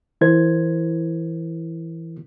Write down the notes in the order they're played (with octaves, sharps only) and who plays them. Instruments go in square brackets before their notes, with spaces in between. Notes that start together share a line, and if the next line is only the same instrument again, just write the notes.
[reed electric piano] E3 E4 A#4 C5 G#6